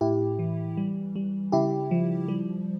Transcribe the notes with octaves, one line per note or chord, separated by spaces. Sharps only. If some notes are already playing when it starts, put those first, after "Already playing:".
A2 E4 G4
E3
G3
G3
C#3 E4 G4
F3
G3